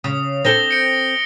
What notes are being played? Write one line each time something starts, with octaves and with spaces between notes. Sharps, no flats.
C#3 D#6
C4 D4 A4 A#6 G7
C#7 D7